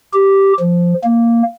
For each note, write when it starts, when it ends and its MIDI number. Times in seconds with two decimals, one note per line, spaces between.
0.13 0.53 67
0.60 0.94 53
1.04 1.43 58